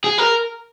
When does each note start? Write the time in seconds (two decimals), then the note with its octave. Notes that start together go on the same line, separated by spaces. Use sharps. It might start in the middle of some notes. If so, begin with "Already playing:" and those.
0.04 G#4
0.18 A#4